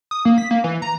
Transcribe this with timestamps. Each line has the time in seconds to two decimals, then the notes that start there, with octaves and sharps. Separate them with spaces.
0.11 D#6
0.25 A#3
0.38 B6
0.51 A#3
0.64 E3
0.82 A#5